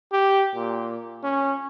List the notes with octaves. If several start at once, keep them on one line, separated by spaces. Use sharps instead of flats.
G4
A#2
C#4